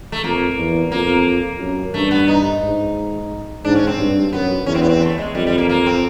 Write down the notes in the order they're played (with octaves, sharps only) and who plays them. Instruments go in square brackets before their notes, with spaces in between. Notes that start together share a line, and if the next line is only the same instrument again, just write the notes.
[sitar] A3
[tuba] F2 [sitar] A#3
[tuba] E2
[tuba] F2 [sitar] A#3
[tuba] F#2
[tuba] G2 [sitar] A3
[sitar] B3
D#4
[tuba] G#2
[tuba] G#2 [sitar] D4
[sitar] C#4
C4
[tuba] G2
[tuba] F#2 [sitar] B3
[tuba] E2 [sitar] C#4
[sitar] C4
B3
C4
A3
G#3
[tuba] F2 [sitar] G3
[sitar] G3
A#3
A#3
C4